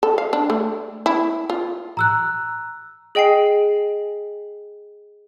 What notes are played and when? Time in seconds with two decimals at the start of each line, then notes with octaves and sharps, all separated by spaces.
0.03 A4
0.18 F5
0.33 D4
0.50 A3
1.06 E4
1.50 F4
1.97 A#5 E6 F#6
3.15 G#4 D#5 G5 G#5 C7